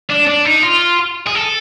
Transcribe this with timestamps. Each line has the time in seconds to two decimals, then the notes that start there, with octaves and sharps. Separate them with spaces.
0.10 D4
0.27 D4
0.45 D#4
0.63 F4
1.27 G#4
1.35 A4